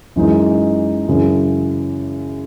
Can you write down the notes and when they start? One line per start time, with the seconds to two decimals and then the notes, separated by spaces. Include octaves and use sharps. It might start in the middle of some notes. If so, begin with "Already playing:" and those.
0.16 F#2 E3 G#3 D#4
1.08 F#2 C#3 E3